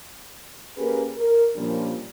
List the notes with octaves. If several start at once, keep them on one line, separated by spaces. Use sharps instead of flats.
A#3 C#4 G4 G#4 A#4 B4
A#4
A#2 F3 G3 A#3 C#4 D4